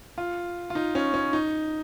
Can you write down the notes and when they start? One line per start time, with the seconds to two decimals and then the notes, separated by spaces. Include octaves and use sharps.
0.18 F4
0.70 F4
0.75 D#4
0.95 C#4
1.14 C#4
1.33 D#4